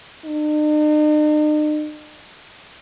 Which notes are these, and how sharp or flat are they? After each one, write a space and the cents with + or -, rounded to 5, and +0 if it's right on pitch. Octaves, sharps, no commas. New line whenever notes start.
D#4 -45